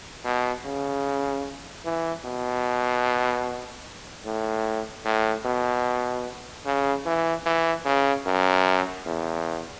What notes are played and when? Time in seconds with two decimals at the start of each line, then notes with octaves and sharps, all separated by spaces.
0.25 B2
0.65 C#3
1.85 E3
2.24 B2
4.25 A2
5.05 A2
5.45 B2
6.66 C#3
7.06 E3
7.46 E3
7.85 C#3
8.26 F#2
9.06 E2